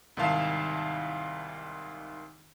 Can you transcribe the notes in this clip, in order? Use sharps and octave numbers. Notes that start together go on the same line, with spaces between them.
C2 G#2 D#3 E4 F5 A5